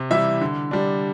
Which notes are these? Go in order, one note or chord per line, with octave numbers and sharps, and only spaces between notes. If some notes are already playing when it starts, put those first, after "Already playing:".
Already playing: C3
E3 G3 E4 E5
D3
G3 D4